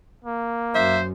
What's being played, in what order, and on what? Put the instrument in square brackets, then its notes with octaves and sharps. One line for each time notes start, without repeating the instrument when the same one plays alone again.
[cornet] A#3
[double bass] F#2 [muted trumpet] C5 [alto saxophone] E5